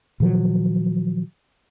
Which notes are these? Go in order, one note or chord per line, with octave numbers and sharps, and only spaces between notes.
A#2 D#3 F3 F#3